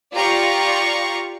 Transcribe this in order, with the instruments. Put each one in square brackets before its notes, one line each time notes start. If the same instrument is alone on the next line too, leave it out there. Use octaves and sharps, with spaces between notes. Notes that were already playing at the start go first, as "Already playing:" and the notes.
[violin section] F4 G4 D5 F5 A#5 C#6